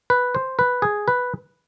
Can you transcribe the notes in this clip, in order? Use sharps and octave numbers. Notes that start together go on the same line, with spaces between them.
B4
C5
B4
G#4
B4